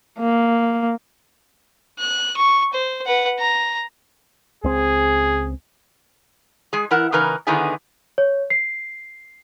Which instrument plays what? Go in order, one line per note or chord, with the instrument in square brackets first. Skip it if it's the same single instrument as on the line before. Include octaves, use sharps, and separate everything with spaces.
[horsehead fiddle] A#3
[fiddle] F#6
C#6
C5
B4 F#5
A#5
[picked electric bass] C#2 C4 [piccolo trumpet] G#4
[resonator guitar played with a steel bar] G#3 G#4
E3 E4 A#4 F#5
C#3 E3 D#4 A#4 B4
D3 D#3 B3 D#4 E4 G#4
[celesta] C#5
C7